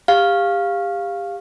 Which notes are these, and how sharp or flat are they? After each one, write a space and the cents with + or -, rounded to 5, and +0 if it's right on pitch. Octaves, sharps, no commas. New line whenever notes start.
G4 +30 F5 +0